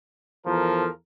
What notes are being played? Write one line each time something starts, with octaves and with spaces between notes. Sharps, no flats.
E2 F3 A4 A#4